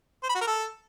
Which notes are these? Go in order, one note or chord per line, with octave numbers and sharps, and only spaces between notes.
C5
B5
F#4
A#4
A4